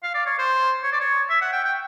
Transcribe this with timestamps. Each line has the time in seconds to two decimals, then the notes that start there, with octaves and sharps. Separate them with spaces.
0.03 F5
0.14 D5
0.26 C#5
0.39 C5
0.83 C#5
0.92 D5
1.01 C#5
1.30 E5
1.41 F#5
1.53 G5
1.64 G5